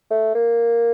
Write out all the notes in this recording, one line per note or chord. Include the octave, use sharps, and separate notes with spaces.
A3
A#3